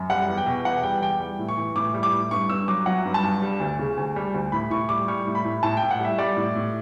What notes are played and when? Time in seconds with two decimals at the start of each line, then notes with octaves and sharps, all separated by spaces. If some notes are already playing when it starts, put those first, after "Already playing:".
Already playing: F#2
0.10 G3 F#5
0.28 E2
0.37 G5
0.46 B2
0.65 E2 F#5
0.83 G3 G5
1.01 E2 G5
1.20 G3
1.39 A2
1.49 C#6
1.57 E3
1.76 A2 D6
1.94 G3
2.03 D6
2.12 A2
2.31 G2 C#6
2.49 G2 E6
2.68 F#3 D6
2.86 F#3 F#5
3.05 G2
3.14 A5
3.23 G2
3.42 G3
3.60 D2
3.79 C#3
3.97 D2
4.16 G3
4.34 D2
4.52 A2 B5
4.70 A2 C#6
4.89 G3 D6
5.08 G3 C#6
5.27 A2
5.35 B5
5.45 A2
5.63 A2 A5
5.77 G5
5.82 A2
5.91 F#5
5.99 G3 E5
6.18 G3 D5
6.37 A2
6.55 A2